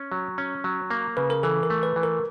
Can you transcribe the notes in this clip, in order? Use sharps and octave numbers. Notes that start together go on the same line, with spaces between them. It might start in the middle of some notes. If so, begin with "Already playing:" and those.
Already playing: C#4
F#3
C#4
F#3
A#3
C#3 B4
A#4
E3 A4
A#4
A3
B4
E3
A#4